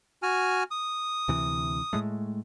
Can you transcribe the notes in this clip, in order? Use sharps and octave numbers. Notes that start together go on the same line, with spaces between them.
F#4 G#5 F6
D#6
D2 C3 E3
A2 G#3 A3